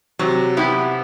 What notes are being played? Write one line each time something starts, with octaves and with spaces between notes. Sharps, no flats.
C3 F#3
B3 E4 G4